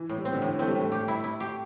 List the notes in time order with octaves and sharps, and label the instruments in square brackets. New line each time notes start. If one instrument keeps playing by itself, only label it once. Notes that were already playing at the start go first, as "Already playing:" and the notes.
Already playing: [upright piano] E3
[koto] A2
[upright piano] G3
[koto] C4
[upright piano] D3
[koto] A2 [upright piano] E3
[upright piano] E3
[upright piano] A3 [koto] C4
[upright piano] G3
[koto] A2 [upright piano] A3
[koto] G4
E4
E4
G4